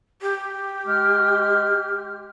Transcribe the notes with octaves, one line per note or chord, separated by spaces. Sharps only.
G4
G#3 F6